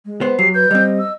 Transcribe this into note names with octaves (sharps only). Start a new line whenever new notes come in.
G#3
B3 C5
F#3 G4 C7
B4 G6
G3 C4 D#5
E6